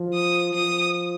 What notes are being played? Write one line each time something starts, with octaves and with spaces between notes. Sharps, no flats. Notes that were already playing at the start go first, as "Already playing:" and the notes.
Already playing: F3
D#6
F3 D#6